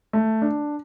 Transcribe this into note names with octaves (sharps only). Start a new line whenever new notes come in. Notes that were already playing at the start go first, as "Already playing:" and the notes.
A3
D4